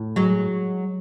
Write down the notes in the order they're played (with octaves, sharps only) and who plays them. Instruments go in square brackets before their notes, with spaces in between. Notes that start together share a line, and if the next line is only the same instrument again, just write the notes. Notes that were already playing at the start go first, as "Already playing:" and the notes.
Already playing: [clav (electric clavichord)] A2
[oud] F#3 G#3